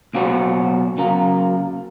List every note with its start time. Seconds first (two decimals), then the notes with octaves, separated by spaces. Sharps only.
0.14 B1 A#3 F#4 C5 C#5
0.98 C#3 F#3 A#3